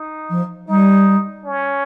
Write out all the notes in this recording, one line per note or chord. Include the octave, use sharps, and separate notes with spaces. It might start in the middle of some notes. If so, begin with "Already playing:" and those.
Already playing: D#4
F3
G3 D#4
C#4